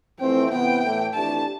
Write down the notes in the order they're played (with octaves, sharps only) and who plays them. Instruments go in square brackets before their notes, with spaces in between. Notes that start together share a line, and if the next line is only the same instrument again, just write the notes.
[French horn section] F2 E3 A3 C4 [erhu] G5
[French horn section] C3 E3 B3 [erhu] G5
[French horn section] A2 E3 A3
[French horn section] F2 E3 A3 D4 G4 [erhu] A5